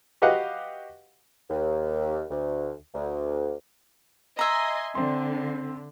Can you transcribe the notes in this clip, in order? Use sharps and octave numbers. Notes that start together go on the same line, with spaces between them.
F#4 G4 B4 D#5 F5 F#5
D#2
D2
D2
D#5 E5 G#5 A#5 C6
D3 C4 C6